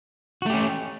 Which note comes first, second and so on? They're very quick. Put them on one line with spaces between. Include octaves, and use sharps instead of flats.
F#4 A3 G4 C#4